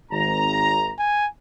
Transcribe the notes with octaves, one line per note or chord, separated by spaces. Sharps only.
G#1 A#5
G#5